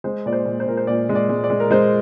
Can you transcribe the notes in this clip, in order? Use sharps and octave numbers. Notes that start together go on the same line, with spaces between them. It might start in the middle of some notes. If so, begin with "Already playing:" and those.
G#3 C5
A#2 D5
C5
A#2
C5
A#2 A#4
C5
A#2 D5
G#3
D5
G#3
D5
G#3
A#4
G#3 C5